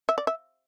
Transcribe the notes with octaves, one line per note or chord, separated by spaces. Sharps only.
E5
D5
E5